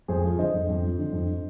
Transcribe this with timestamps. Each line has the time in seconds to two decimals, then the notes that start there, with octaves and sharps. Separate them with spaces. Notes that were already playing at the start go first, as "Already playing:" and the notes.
0.08 F2 G#4 C5
0.24 F3
0.39 D3 C5 D#5
0.54 F2
0.69 F2
0.83 F3
0.99 D3
1.13 F2